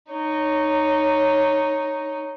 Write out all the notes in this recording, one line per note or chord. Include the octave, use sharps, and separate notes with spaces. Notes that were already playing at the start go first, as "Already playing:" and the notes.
D#4 C#5